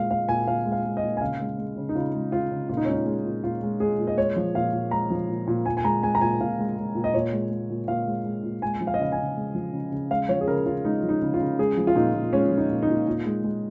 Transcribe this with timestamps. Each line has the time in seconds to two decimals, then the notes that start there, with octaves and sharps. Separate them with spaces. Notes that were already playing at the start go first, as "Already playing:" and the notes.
Already playing: A#2 G#3 F5
0.11 G#3 F5
0.29 A#2 G#5
0.47 A#2 F5
0.65 G#3
0.72 F5
0.85 G#3
0.97 D#5
1.03 A#2
1.17 G#5
1.21 C#3 F5
1.40 G#3
1.58 G#3
1.77 C#3
1.89 D#4
1.95 C#3 F4
2.14 G#3
2.32 G#3 F4
2.51 C#3
2.69 A#2 F4
2.77 D#4
2.85 C#4
2.88 G#3 D#4
3.06 G#3
3.25 A#2
3.43 A#2 F4
3.63 G#3
3.80 G#3 G#4
3.99 A#2
4.07 D#5
4.17 G#3 C#5
4.36 F3
4.55 A#2 F5
4.73 A#2
4.91 G#3 A#5
5.10 F3
5.29 A#2
5.47 A#2
5.66 A#2 G#5
5.77 G#5
5.84 G#3 A#5
6.03 G#3 G#5
6.15 A#5
6.21 A#2 G#5
6.41 A#2 F5
6.59 G#3
6.77 G#3
6.95 A#2
7.04 D#5
7.14 A#2 C#5
7.33 G#3
7.51 G#3
7.70 A#2
7.88 A#2 F5
8.06 G#3
8.25 G#3
8.43 A#2
8.62 G#3 G#5
8.81 F3
8.87 F5
8.94 D#5
8.99 C#3 F5
9.12 G#5
9.18 C#3
9.37 G#3
9.55 F3
9.73 C#3
9.92 C#3
10.10 G#3 F5
10.29 F3 C#5
10.41 G#4
10.48 C#3 A#4
10.66 C#3 F4
10.85 G#3 D#4
11.03 F3
11.09 D#4
11.22 C#3
11.34 F4
11.40 C#3
11.59 G#3 G#4
11.77 F3
11.87 F4
11.95 A#2 D#4
12.14 A#2
12.33 G#3 C#4
12.51 F3
12.57 D#4
12.70 A#2
12.82 D#4
12.89 A#2
13.07 A#2
13.25 G#3
13.44 G#3